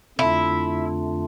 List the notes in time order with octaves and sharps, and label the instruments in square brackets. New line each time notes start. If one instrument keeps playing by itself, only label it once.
[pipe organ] F2 D3 A3 D4 F4 [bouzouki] E4